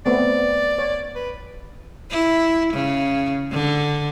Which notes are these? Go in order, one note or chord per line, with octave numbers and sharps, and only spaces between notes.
A3 B3 C4 D5
C#5
B4
E4
C#3
D3